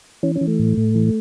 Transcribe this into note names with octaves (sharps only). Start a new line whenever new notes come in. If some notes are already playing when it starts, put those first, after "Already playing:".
E3 C#4
C#4
E3
A3
A2
A2
E3